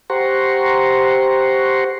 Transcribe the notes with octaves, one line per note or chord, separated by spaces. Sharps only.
G4 C5 F#5 A#5 C6 C#6